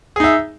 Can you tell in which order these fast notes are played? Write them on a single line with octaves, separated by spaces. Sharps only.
G#4 D#4 E5